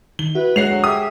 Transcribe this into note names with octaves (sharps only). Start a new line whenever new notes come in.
D#3 G7
E4 F#4 B4
G#3 F#4 C#5 F#5 C7 F7
D2 F#3
G4 G#4 E5 D#6